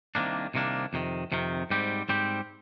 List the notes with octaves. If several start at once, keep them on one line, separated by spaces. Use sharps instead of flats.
C2 C3 D#3 A#3 D4
C2 C3 D#3 A#3 D4
F2 C3 D#3
F2 C3 D#3
G#2 G3 C4 G4
G#2 G3 C4 G4